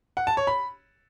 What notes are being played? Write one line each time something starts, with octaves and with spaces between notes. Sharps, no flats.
F#5
A5
C#5
B5